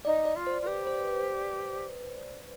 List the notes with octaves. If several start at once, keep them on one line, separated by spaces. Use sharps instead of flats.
D#4 D5
D5
F4
C5
F4
G4 B4
C5
D5